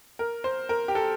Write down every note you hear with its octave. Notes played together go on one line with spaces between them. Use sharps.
A#4
C5
A#4
G4
A4